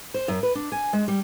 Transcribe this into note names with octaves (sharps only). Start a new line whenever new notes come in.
C5
F#2
B4
D4
G#5
G#3
G3